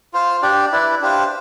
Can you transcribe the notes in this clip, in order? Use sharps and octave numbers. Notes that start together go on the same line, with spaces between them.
F4 C5 F5
D4 G4 D5
E4 B4 D5
D4 G4 C5 F5